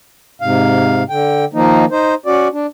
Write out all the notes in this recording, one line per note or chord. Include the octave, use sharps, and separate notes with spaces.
G#2 C3 F5
D3 G5
D#3 F3 A#3 D#4
D#4 C5
C#4 F#4 D5
D4